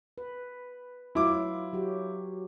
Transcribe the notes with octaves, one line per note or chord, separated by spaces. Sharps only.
B4
F#3 E4 F4 D6
F#3 F#4 G4